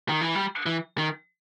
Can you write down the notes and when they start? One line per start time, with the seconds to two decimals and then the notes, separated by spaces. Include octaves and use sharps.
0.09 D#3
0.21 E3
0.35 G3
0.66 E3
0.98 D#3